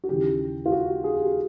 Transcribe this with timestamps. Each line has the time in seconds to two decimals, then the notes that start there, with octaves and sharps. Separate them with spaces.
0.04 F#4
0.09 D#2 C#3 E3 G4
0.66 F4
0.72 F#4
1.04 G#4
1.15 G4
1.26 F#4